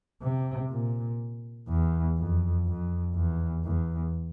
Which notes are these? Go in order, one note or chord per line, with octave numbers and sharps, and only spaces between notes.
C3
A#2
E2
F2
F2
E2
E2